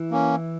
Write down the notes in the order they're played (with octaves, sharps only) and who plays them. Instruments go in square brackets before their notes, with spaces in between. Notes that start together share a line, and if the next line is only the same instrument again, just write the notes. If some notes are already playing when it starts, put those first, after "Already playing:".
Already playing: [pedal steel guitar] E3 E4
[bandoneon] A#3 C#4